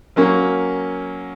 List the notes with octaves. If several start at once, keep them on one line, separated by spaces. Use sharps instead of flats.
F#3 A#3 C#4